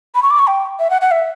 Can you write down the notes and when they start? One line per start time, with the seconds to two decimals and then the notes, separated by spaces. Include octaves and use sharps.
0.15 B5
0.23 C#6
0.31 D6
0.39 C#6
0.47 G5
0.79 E5
0.90 F#5
1.01 F#5
1.11 E5